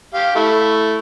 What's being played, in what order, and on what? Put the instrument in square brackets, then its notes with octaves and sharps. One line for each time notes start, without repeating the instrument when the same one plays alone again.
[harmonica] G4 F5
A3 E4